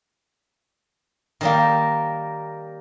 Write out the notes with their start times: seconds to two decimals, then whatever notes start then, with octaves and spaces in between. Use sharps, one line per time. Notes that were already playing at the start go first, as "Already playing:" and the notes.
1.41 D#3 G3 A#3